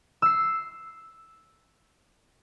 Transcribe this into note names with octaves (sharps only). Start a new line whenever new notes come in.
E6 C7